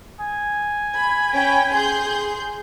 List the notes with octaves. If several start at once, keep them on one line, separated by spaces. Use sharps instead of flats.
G#5
B5
C#4 G5 B5
G#4 C6 G6